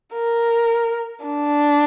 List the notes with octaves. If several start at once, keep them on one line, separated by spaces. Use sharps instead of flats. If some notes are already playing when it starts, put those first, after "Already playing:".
A#4
D4